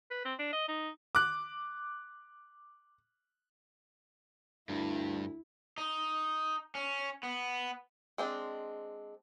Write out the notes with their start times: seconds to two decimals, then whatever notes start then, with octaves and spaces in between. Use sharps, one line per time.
0.11 B4
0.25 C4
0.39 D4
0.53 D#5
0.68 D#4
1.15 D6 F#6
4.69 D2 G2 E4
5.78 D#4
6.75 C#4
7.23 B3
8.18 G#3 C4 D4